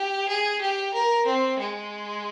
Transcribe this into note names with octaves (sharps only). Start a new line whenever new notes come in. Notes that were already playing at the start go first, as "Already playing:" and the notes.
Already playing: G4
G#4
G4
A#4
C4
G#3